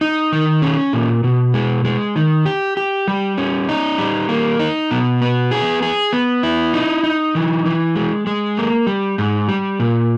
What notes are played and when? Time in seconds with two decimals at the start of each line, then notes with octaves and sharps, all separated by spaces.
0.01 D#4
0.32 D#3
0.62 C#4
0.93 A#2
1.24 B2
1.54 G#3
1.85 G#3
2.16 D#3
2.46 G4
2.77 G4
3.08 G3
3.38 C#4
3.69 D#4
3.98 G3
4.29 A#3
4.60 D#4
4.91 B2
5.21 B3
5.51 G#4
5.82 G#4
6.13 B3
6.43 E4
6.74 D#4
7.03 D#4
7.35 E3
7.66 E3
7.95 G#3
8.27 G#3
8.57 A#3
8.87 G3
9.18 G#2
9.48 G3
9.79 A#2